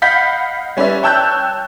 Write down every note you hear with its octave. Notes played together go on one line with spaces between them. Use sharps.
D#5 F5 F#5 B5 G6 B6
G3 C#4 B4 D5 E5
C#5 G5 A5 E6 F#6 G6